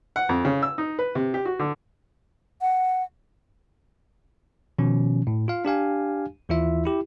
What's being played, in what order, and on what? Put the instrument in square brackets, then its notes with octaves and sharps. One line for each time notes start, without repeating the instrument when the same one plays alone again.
[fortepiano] F#5
F2
C#3
E6
D#4
B4
C3
G4
F#4
D3
[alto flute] F#5
[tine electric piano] B2 D#3 F3 C#4
A2
F4 F5
D4 G4 F5 G#5
D#2 E3 E4 F4 E5
E4 G4